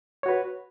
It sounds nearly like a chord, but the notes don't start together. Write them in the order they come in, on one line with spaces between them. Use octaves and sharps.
C#5 F#4 B4